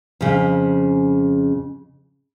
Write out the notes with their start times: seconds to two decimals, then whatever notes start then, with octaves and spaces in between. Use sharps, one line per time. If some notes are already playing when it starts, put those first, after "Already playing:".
0.21 F2 C#3